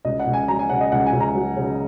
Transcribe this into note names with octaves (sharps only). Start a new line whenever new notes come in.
C#2 D#5
F#5
C#2
G#5
F#3 A#5
G#5
C#3 F#5
D#5
C#2 F#5
G#5
C#2
A#5
F#3
C#3